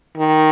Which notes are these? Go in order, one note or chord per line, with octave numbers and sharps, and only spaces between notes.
D#3